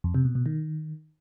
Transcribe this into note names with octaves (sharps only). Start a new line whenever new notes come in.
F2
C3
B2
B2
D#3